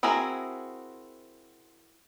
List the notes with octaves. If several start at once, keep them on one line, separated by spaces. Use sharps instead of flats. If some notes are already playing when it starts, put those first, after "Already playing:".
C4 E4 F#4 G#4 A#4